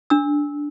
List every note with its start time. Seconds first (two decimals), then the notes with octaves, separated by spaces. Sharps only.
0.10 D4 E6